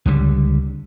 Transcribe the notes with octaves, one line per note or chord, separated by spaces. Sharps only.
C#2 D3 G3